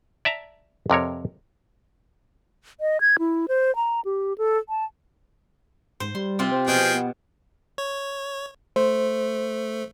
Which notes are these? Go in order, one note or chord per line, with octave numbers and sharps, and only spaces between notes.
D5 E5 A5 A#5
F2 C3 A#4 C#5
D#5
G#6
E4
C5
A#5
G4
A4
A5
G#2 C5
G3 C6
C3 C4 F4
C5
B2 F3 G#4 G5
B3
C#5
A3 C5